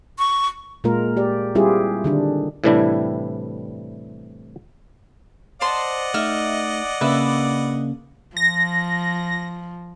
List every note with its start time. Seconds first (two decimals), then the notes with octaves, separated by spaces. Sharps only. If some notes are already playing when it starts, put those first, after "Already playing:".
0.19 C#6
0.84 A#2 G#3 A#3 F4 A#4
1.17 G4 D5
1.55 G3 C4 E4 F4 G4 G#4
2.04 D3 D#3 D4
2.64 A2 C3 E3 G3 D4 E4
5.61 C5 D5 D#5 F#5 A5 C6
6.14 A3 D#4 E5 F6
7.01 C#3 A#3 D4 B4 E5 F#6
8.37 F3 A#6